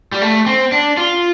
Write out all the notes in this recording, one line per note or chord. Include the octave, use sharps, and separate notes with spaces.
G3
A3
C4
D4
F4